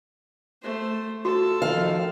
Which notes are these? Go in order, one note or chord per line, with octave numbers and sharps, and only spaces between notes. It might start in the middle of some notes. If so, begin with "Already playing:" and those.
A3 C5
F4 F#4 A4
D#3 F3 F5